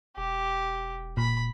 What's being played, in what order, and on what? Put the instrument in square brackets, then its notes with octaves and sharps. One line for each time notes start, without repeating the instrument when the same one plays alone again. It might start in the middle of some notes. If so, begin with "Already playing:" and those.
[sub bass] E1 [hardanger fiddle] G4
[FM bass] A#2 [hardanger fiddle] B5